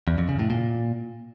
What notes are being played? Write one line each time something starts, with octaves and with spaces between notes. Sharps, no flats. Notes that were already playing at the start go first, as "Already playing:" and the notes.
E2
F2
C#3
A2
A#2